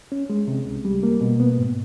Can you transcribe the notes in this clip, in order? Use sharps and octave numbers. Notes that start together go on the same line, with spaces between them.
C#4
G#3
C3
C2
G3
A#3
B2
B3
G#2